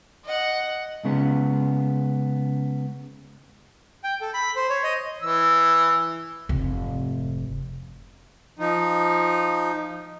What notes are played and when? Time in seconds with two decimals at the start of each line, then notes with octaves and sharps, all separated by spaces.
0.25 D#5 F#5
1.05 C#3 G#3 B3 C#4
4.04 G5
4.21 A4
4.34 B5
4.56 C5
4.69 C#5
4.83 D#5
5.22 E3 E6
6.49 F1 G#2
8.59 F3 D#4